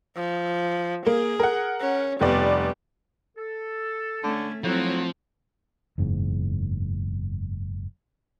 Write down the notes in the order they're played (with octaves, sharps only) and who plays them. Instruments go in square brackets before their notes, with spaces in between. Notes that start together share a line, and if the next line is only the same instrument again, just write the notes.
[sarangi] F3
[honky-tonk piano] A#3 [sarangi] G#4
[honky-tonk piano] A#4 F#5
[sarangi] C#4
[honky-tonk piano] F1 B3 D5 [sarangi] G3
[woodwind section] A4
[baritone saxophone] D3 [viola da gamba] A3 C#4
[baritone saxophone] A2 [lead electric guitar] F3 [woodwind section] F#3 F#4 [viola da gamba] C4
[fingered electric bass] F#1 E2 G#2